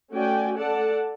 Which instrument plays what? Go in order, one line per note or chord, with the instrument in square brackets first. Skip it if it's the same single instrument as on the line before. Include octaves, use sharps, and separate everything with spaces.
[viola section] A3 C#4 F#4 D5 G5 G#5
A4 D5 F#5 A5